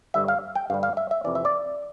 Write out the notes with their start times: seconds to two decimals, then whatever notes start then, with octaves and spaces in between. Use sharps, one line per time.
0.14 G2 D3 G3 E5
0.28 F5
0.55 G5
0.70 G2 D3 G3 F5
0.83 F5
0.97 E5
1.11 E5
1.24 F2 C3 E3 D5
1.35 E5
1.45 D5